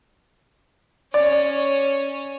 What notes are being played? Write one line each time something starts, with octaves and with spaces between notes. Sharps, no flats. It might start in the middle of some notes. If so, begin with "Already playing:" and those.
C#4 C#5 D5